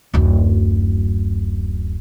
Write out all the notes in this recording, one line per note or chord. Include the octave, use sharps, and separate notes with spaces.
D1 F#2